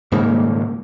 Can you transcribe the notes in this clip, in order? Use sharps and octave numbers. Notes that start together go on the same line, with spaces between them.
D#1 G#2 C#3 A#3